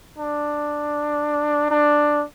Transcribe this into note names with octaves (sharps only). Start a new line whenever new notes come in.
D4
D4